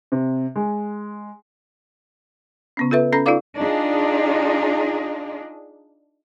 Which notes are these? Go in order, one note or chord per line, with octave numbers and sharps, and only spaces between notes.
C3
G#3
C#3 B3 C#4
F4 A4 B4 E5
C#4 A4 A#5 A#6
D#4 F4 A4 D5 F5 D6
D4 D#4 F4 G#4